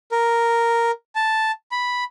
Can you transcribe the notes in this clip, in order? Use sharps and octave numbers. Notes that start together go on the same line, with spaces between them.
A#4
A5
B5